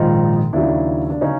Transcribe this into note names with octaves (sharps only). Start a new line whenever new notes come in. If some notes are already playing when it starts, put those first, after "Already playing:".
Already playing: A#1 G#2 D#3 D#4 F4
D#2 C#3 F#3 D4 E4
D4
C#3 F#3 C#4 D#4